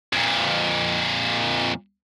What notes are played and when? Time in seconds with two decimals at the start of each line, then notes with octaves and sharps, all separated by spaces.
0.13 F2 A#2